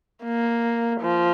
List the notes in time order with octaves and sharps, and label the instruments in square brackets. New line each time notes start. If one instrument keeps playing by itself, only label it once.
[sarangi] A#3
F3